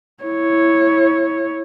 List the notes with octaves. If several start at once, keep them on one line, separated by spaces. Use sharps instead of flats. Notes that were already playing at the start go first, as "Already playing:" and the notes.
E4 C#5